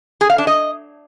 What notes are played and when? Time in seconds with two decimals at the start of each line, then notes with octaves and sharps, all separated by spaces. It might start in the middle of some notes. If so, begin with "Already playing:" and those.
0.21 G#4
0.30 F5
0.38 D4
0.47 D#5